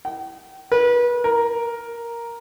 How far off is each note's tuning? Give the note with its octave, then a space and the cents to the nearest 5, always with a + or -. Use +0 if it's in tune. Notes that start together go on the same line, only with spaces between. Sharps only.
G5 -40
B4 -35
A#4 +5